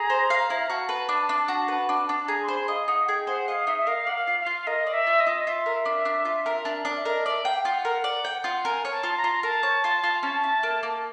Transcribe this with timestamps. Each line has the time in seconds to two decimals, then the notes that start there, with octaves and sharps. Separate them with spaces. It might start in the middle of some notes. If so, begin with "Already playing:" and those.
Already playing: G#4 A#5
0.10 C5
0.30 F5
0.50 E4
0.70 F#4 A5
0.89 B4
1.09 D4
1.29 D4
1.48 F#4
1.68 B4
1.89 D4
2.09 D4
2.23 A5
2.28 G#4 A#5
2.43 C6
2.48 C5 B5
2.68 D#5 F5
2.88 D#4 F#5
3.07 G#4 G5
3.27 C5 F#5
3.48 D#5 F5
3.67 D#4 E5
3.78 E5
3.87 A#4 F5
4.07 D5 F#5
4.13 F5
4.27 F4
4.40 F5
4.46 F4
4.67 A#4 D#5
4.87 D5
4.93 E5
5.07 F4
5.20 D#5
5.26 F4
5.46 F4 E5
5.66 A#4
5.85 D4
6.05 D4
6.25 F4
6.46 A#4
6.65 D4
6.85 D4
6.97 E5
7.05 A#4 D#5
7.26 D5 E5
7.45 F5 G5
7.65 F4 F#5
7.85 A#4
8.04 D5
8.25 G5
8.44 F4
8.65 A#4 G#5
8.85 C#5
8.91 A5
9.03 F4
9.17 A#5
9.24 F4
9.43 A#4 A5
9.63 C#5
9.84 F4
10.03 F4
10.23 C#4 A5
10.43 E4
10.63 A#3
10.83 A#3